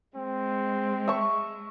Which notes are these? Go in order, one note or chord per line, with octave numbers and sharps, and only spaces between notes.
G#3 C4
E5 C#6